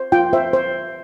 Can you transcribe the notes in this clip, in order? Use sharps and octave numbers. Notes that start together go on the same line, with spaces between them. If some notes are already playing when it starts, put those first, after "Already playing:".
Already playing: C5
F4 G5
C5 E5
C5